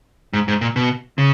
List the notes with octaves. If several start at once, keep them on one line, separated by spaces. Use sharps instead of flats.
G#2
G#2
A#2
B2
C#3